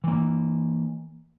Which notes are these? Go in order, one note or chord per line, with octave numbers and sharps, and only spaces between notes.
E3 A#3